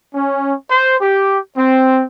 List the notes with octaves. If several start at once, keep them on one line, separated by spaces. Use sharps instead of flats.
C#4
C5
G4
C4